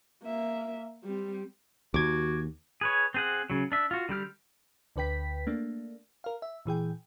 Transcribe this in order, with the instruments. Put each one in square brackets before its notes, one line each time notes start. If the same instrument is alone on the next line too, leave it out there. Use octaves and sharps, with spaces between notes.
[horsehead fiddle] A#3 E5
G3 C4
[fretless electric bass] D#2 [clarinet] F#4 [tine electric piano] D6 G#6
[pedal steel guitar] G#4 B4 C#5
C4 G#4 F#5
C#3 F#3
D4 E5
F4 F#4
D3 G3 G4 F6
[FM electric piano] D2 D3 B4 G5 B6
A3 A#3 D4
A#4 F5
E5
A#2 E3 G#4 G5